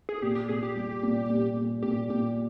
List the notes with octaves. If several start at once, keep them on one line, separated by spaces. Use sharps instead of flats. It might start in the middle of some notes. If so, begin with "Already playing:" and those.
G#4
A#2 G4
G4
A#2 G#4
G4
G3
A#2
A#2
A#2
A#2 G4
A#2 G4